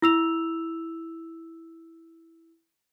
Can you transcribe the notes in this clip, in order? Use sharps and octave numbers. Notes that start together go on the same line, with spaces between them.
E4 E6 F7